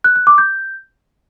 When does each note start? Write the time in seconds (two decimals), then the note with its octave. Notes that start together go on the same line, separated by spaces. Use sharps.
0.04 F#6
0.16 F#6
0.27 D6
0.38 G6